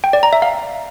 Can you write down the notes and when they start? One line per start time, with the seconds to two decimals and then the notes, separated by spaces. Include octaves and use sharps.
0.04 G5
0.13 D5
0.23 A#5
0.33 E5
0.42 F5